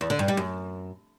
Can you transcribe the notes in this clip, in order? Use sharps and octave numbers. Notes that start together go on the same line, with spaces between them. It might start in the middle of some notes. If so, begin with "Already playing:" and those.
E2
D3
G2
G3
F#2